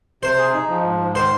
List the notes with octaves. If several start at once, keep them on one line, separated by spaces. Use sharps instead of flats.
C3 C5
G#4
D#4
F3
G#2
G#2
D#3 C5